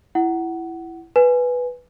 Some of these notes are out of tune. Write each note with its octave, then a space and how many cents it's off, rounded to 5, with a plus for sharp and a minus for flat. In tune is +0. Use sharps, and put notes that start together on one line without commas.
E4 +15 F#5 +15
B4 +0 G#5 +0